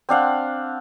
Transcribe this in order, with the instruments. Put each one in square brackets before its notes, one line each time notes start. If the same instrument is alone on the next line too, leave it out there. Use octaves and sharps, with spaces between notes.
[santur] C4 D4 F5 F#5